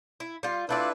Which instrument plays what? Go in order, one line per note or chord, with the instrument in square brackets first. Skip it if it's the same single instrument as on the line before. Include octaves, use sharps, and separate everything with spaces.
[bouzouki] E4
G3 F4
[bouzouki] A3 F4 D5 [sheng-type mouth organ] D4 E4 B4